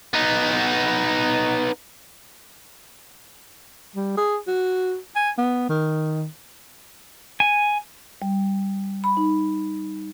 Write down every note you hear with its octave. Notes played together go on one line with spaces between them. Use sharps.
B3 D#4
G3
G#4
F#4
G#5
B3
D#3
G#5
G3
B5
D#4